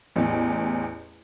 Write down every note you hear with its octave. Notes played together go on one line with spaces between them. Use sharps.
A1 E2